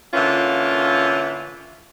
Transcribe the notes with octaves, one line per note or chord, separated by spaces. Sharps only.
D3 E3 A#3 C#4 F4